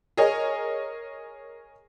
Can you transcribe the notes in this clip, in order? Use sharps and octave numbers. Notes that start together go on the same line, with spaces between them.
G#4 A#4 C#5 D#5